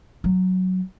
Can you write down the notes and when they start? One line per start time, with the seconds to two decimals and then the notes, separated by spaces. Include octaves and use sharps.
0.24 F#3